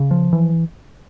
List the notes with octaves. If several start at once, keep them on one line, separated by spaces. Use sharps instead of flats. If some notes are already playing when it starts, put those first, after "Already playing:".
Already playing: C#3
F3
E3